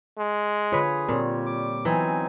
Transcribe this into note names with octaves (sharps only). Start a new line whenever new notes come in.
G#3
D3 F4 G#4 B4 C#5
A#2 G3 C4 C#5
D6
E3 F#3 B3 C4 D#4 G#5